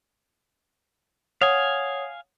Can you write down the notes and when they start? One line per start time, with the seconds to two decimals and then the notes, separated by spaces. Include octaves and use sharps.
1.41 C#5 F5 F#5 G#5 D#6